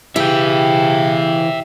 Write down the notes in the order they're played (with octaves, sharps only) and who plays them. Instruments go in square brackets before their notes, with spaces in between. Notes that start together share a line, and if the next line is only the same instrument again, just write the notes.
[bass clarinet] C#3 [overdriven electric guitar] E3 [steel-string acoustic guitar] G4 [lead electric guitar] E5 G5